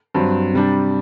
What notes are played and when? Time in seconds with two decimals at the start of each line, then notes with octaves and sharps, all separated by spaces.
0.14 G2 F#3 C4
0.54 C3 G3 D4